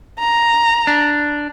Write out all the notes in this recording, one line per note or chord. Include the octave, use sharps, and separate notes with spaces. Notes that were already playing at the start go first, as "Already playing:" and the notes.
A#5
D4